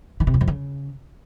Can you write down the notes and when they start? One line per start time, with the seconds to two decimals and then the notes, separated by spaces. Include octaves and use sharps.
0.20 D#3
0.27 C3
0.34 E2
0.41 F2
0.48 C#3